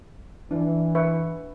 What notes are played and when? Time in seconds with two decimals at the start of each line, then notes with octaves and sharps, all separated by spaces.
0.51 E3 D4
0.95 B4 E5 C#6